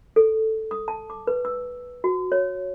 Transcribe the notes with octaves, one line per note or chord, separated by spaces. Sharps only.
A4
D#6
A5
D6
B4
E6
F#4
C#5